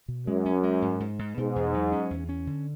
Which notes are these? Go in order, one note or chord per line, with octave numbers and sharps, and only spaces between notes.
B2
F#2 G#3
C#4
G#3
G#2
G#2
G#2
G#2 B2
E2
F#3
C#4
E2
C#4
D3